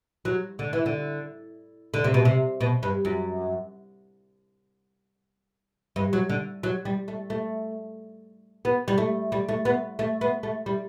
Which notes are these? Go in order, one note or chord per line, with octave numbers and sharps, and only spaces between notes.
F#3
D3
E3
D3
D3
C3
B2
C3
B2
G2
F#2
G2
F#3
D3
F#3
G3
A3
A3
B3
G3
A3
G3
A3
B3
A3
B3
A3
G3